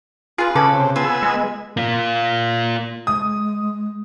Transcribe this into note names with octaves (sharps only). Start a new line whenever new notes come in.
F4 G#4 B4
C#3 A4 B4 D6
C3
B3 F4 G#5 E6
G#3
A#3 F4
G#3 D#6